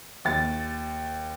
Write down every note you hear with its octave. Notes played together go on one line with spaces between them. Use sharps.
D#2 A6